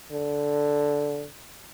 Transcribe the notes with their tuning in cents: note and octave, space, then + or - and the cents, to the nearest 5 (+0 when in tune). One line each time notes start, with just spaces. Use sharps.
D3 -10